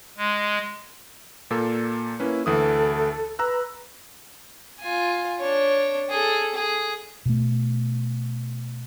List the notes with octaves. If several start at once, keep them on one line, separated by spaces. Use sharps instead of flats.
G#3
A#2 A#3 A4
A#3 C#4 E4 B4
D2 E3 A4 D#6
B4 A#5 E6 F#6
F4 G#5
D4 C#5
G#4 A4
G#4
B2 A3